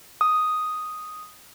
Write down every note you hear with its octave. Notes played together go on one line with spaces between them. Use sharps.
D#6